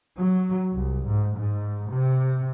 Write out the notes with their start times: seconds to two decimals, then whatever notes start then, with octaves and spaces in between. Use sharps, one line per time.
0.19 F#3
0.74 C2
1.07 G#2
1.36 G#2
1.91 C3